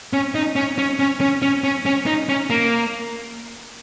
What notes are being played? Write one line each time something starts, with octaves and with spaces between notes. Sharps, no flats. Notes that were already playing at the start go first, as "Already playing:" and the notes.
C#4
D#4
C#4
C#4
C#4
C#4
C#4
C#4
C#4
D#4
C#4
A#3